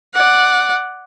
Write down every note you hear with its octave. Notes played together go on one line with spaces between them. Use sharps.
D5 F#5